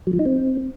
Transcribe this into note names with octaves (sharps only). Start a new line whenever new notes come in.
F#3
F3
D#4
C4